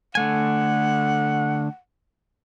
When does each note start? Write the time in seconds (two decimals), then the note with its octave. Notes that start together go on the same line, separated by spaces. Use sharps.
0.15 D3 A3 F#5 G#5